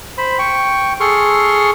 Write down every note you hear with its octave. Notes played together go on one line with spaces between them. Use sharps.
C5 B5
G5 C#6
G#4 A4 C6 C#6 F6